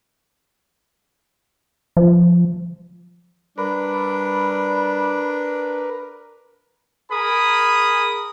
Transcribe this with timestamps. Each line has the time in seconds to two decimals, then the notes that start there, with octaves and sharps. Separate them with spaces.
1.97 F3
3.58 G3 D4 A#4 B4 B5
7.10 G#4 A#4 B5 D#6